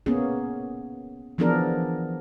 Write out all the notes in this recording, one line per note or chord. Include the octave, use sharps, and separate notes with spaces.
A#3 B3 C#4 G#4
E3 F3 B3 D4 G#4 A#4